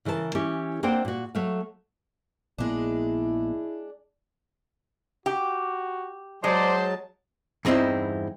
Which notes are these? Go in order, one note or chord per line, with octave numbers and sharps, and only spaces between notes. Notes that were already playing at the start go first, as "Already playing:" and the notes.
C#3 E3 A#4 B4 A5
E3 C#4 G4
A#3 C4 D4 C5 F#5 G5
A#2 F#4
F#3 A3 F5
A#1 A#2 G#3 B3 D4 E4
F#4 G4
F#3 G#3 C5 D5 A5
E2 G2 C4 D#4 E4